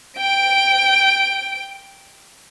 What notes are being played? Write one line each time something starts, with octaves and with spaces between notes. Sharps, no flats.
G5 D7